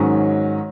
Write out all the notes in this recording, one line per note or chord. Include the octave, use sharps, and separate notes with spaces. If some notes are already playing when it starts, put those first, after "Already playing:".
Already playing: G#2 D#3 F#3 C#4